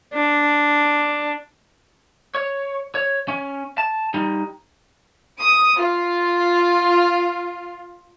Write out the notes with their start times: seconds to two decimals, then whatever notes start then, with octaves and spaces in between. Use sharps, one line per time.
0.13 D4
2.35 C#5
2.95 C#5
3.28 C#4
3.78 A5
4.14 G3 D#4
5.39 D#6
5.80 F4